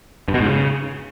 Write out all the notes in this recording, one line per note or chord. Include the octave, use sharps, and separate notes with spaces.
G2
B2
G#2
C#3